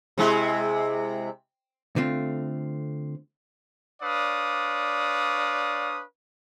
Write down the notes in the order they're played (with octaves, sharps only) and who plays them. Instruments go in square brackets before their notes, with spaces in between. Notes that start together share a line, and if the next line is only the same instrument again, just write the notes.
[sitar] C3 G#3 E4
[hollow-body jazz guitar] D3 A3 C4 F4
[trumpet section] D4 B4 C#5 D5 F5 D#6